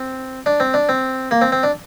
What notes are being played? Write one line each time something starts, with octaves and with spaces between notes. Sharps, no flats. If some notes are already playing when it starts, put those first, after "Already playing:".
Already playing: C4
D4
C4
D4
C4
A#3
C4
C4
D4